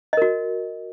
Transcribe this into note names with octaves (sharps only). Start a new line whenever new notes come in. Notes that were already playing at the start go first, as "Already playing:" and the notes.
F#4 A#4 D#5